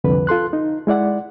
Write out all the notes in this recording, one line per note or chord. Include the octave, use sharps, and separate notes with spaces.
C2 F2 D3 B4
F4 A4 C6 F#6
D#4
G#3 E4 D5 F#5